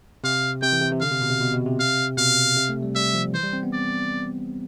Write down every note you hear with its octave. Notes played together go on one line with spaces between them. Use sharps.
C3 F5
C3 G5
E3
C3
C3
D3 F5
C3
B2
C3
B2
B2
C3
F5
B2 F5
C3
A3
G3
G3 E5
F3
E3 C5
G3
C4
B3
D5